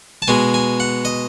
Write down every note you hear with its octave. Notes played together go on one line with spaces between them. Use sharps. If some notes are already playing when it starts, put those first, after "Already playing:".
A5
B2 G#3 G#5
G#5
F#5
D#5